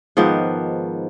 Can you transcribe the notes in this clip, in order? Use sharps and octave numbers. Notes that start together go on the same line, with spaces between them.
G#2 D#3 F3 B3